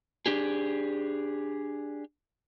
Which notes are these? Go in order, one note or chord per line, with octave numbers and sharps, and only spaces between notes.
D4 G4 G#4